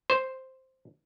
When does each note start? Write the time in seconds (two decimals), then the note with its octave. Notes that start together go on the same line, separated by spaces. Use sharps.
0.10 C5